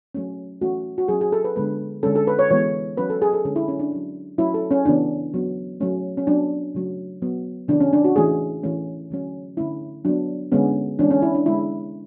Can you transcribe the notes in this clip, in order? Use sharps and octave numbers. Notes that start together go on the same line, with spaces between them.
F#3 A3 C#4
E3 A3 C#4 F#4
F#4
F#3 C#4 G#4
G#4
A4
B4
D3 G#3 B3 B4
D3 G#3 C#4 A4
A4
B4
C#5
E3 G#3 B3 C#5
F#3 C#4 B4
A4
G#4
A4
D3 G#3 C#4 G#4
E4
C#4
D4
F#3 C#4
F#3 A3 C#4 E4
A4
C#4
C#3 E3 B3 D4
F#3 B3
F#3 A3 C#4
C#4
F#3 B3 D4
C#3 F#3 A3 C#4
F#3 B3
C#3 E3 B3 D4
C#4
D4
F#4
E3 A3 C#4 G#4
E3 A3 C#4
D3 F#3 A3 C#4
D3 A3 C#4 E4
F#3 B3 D4
D3 G#3 B3 C#4
E3 G#3 C#4 D4
C#4
E4
D4
D3 G#3 B3 E4